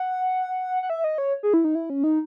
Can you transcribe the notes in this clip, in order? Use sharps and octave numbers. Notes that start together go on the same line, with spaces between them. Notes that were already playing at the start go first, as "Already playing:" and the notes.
Already playing: F#5
F#5
E5
D#5
C#5
G#4
E4
D#4
E4
C#4
D#4